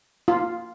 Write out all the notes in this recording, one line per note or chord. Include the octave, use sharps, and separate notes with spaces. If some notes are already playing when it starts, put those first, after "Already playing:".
F4